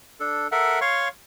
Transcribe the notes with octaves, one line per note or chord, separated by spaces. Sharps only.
D4 A4
A4 A#4 E5 F#5
C#5 F5 C6 C#6